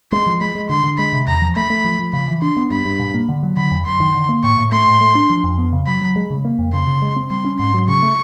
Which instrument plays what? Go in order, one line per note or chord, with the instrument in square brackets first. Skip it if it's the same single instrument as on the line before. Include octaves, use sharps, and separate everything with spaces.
[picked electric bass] G#3 [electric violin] C6
[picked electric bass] F3
[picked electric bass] G#3 [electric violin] B5
[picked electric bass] G#3
[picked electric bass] D3 [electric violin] C6
[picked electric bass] D3
[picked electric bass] G#3 [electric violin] B5
[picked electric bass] C3
[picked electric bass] E2 [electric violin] A#5
[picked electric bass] F3
[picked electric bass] A3 [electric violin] B5
[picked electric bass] A3
F3
F3
[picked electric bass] C#3 [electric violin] B5
[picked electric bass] E3
[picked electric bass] D4 [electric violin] C6
[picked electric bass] B3
[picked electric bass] G2 [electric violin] B5
[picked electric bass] G2
A#2
A#3
D3
F#3
[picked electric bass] D3 [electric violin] B5
[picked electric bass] F2
[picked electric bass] F#2 [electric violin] C6
[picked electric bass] D#3
D3
A#3
[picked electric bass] A2 [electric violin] C#6
[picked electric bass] A2
[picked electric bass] A3 [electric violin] C6
[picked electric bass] A2
A3
D4
F3
F2
B3
C#3
[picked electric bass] F#3 [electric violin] B5
[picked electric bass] F#3
G#3
C#3
A#3
F2
[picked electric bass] C#3 [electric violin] C6
[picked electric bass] C#3
G#3
C4
[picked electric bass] G3 [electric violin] C6
[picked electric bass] C#4
[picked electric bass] G#2 [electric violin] C6
[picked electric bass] F#3
[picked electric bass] C#3 [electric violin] C#6
[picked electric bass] A3